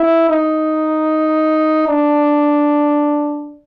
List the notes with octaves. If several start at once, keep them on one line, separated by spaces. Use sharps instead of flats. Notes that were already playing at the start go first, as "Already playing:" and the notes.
Already playing: E4
D#4
D4